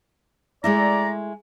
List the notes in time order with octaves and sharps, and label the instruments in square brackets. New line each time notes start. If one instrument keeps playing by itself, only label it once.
[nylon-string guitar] G#3 A3 E4 [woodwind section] D5 A#5